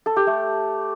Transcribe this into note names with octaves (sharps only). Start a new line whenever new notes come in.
A4
G4
A3